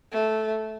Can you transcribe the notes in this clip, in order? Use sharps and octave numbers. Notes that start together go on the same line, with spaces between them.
A3